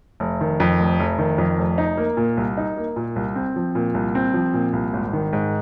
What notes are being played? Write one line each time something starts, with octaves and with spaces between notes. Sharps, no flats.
F1
D#3
F2
F1
F1
D#3
F2
F1
D#4
A#3
A#2
C2
D#4
A#3
A#2
C2
C4
F3
A#2
C2
C4
F3
A#2
C2
G#1
D#3
G#2